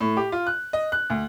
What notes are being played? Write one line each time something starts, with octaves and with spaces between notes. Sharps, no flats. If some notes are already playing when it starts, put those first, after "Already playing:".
A2
G4
F4
F#6
D#5
F#6
D2